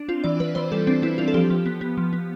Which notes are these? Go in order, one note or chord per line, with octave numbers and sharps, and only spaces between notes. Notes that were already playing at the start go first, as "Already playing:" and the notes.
Already playing: D4
C4 F4
E3 D5
E3 B4
E3 C5
G3 A4
C4 D4
C4 E4
C4 F4
A4
F3 G4
F3
B3
B3
F3
B3